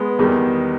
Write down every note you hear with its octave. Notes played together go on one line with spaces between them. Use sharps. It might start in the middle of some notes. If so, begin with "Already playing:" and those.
Already playing: G#3 B3
E2 D#3 G3